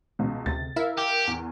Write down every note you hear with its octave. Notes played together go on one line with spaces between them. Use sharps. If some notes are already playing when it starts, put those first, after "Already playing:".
C#2 B2
D2 C3 A6
E4 A#4 E5 F5
G4
E2 G#5